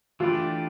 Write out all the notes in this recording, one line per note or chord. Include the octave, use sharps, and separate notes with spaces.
E3 A3 D4 F4 G4 B4